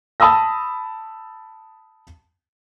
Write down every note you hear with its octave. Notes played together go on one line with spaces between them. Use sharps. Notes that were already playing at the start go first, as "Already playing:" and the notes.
A5 B5 D#6 E6 A#6